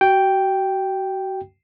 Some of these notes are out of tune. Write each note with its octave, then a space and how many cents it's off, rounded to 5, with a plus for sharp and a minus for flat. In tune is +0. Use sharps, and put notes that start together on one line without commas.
F#4 +35 G5 +0